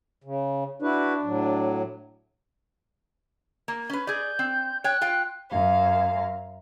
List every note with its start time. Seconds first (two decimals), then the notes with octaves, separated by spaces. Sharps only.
0.24 C#3
0.82 D4 E4 F#4 B4
1.23 A2 F#3
3.68 A#3
3.90 C#4 B4
4.07 G#4 D5 G6
4.39 C4
4.84 C#5 G5 F#6
5.01 F4 F5 G5
5.49 F#2 F5